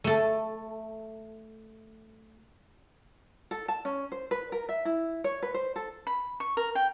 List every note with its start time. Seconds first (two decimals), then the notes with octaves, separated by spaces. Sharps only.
0.04 A3 A4
3.51 A4
3.68 A5
3.85 C#4
4.12 C5
4.31 B4
4.52 A#4
4.69 E5
4.85 E4
5.24 C#5
5.43 B4
5.54 C5
5.76 A4
6.07 B5
6.40 C#6
6.57 A#4
6.75 G5